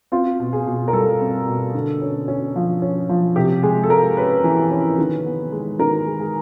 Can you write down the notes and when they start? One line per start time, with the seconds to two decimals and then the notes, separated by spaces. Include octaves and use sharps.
0.12 C4 F4
0.40 B2
0.53 G#4
0.66 B2
0.88 A#4
0.93 G3 A4
1.21 C4
1.47 B2
1.74 D3
2.02 C#4
2.28 C#4
2.56 F3
2.82 C#4
3.09 F3
3.36 C3 G4
3.63 G#3 G#4
3.83 A4
3.90 G#3 A#4
4.17 C#4 B4
4.44 E3
4.71 C#4
4.98 D#3
5.25 B3
5.52 G#3
5.79 D#3 A#4
6.06 G#3
6.20 G#4